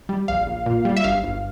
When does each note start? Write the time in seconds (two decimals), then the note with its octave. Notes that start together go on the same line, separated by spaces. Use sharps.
0.09 G3
0.28 A#1 F5
0.47 A#1
0.66 A#2
0.85 G3
0.96 E5
1.04 G1 F5
1.23 G1